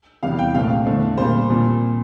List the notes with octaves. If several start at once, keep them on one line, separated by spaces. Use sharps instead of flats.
E2 C3 E3 G3 F5
G5
C2 A#2 A3 C4 F5
E2 D3 A3 C4
A#2 G3 A#3 C5
A#2 F3 C4